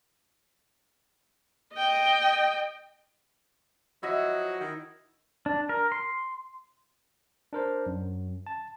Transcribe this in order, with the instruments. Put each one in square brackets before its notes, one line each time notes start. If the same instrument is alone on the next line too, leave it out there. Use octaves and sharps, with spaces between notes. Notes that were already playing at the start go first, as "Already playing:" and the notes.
[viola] D#5 G5
[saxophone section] F3 F#3 F#4 [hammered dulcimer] E4 D#5
[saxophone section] D#3
[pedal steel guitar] D4
A#4
C6
[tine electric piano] D4 A#4 C5
F#2
A5